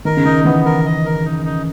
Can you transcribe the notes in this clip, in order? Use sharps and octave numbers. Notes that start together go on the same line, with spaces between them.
D#3 A#4
C#3
D#3 D#4
E3 B3
A#4
D#5
A#4
D#4
D#4